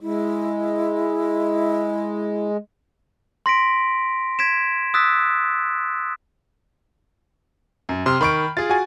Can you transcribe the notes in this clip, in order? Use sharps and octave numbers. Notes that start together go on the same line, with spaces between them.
G#3 E4
C6 A#6 B6 D7
G#6 B6 D7 E7
D#6 E6 F#6 A6 B6
F#2
C3 C6 F6
D#3 B5 C#6 D7
F4 G#4 A6
F#4 G#5